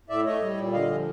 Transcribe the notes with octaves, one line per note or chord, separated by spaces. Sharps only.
A2 D5 E5
A3 C#5 D#5
G3
A#2
D3 D#5 F5
F3